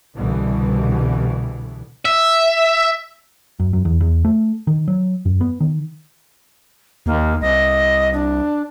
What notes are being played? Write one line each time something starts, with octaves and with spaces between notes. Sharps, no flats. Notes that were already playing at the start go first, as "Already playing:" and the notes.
C2 B2 D3 E3 G3
E5
F#2
F#2
E2
E2
A3
D#3
F#3
F#2
B3
D#3
D#2 A#3
C2 D#5
D4